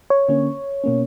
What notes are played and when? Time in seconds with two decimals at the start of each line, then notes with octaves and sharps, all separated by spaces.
0.10 C#5
0.28 D3 A#3 C#4
0.84 B2 A#3 C#4